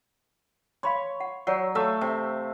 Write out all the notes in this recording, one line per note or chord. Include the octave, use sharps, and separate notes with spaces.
C#5 F5 B5 C6
F#5
F#3 C#5 D5 F#5
A3 A4 E5 F5
C3